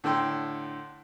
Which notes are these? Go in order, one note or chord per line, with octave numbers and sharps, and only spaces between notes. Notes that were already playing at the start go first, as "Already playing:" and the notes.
A2 D3 A4 G5 C6